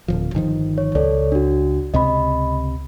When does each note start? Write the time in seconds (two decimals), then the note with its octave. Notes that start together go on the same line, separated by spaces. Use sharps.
0.08 D1 F3
0.34 G1 D#3 F3
0.78 C#5
0.95 C#2 A4 C#5 D5
1.32 D4 F#4
1.94 C#2 C3 D#5 B5